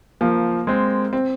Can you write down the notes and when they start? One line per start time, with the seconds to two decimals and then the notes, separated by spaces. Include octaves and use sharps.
0.21 F3 A#3
0.67 G#3 C4
1.13 C4